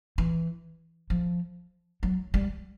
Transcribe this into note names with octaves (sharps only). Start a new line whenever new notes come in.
E3
F3
F#3
G3